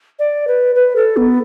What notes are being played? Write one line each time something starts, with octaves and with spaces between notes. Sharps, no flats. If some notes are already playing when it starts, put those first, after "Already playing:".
D5
B4
B4
A4
B3